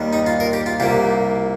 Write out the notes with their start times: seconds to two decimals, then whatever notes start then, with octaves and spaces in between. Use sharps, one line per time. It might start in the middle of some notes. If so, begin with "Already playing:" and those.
Already playing: D#2 D#3 G3
0.13 D#4
0.27 F4
0.40 A#4
0.53 G4
0.66 F4
0.80 C2 A#2 A#3 G4